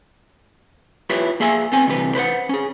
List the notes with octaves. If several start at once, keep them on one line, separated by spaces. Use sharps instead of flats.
E4 F4 G4 B4 C#5
A#3 G#4 E5 G#5
B3 C4 G#5
D2 C3 E3 G3 B4
B4 C5 D#5 F#5
C#4 G#4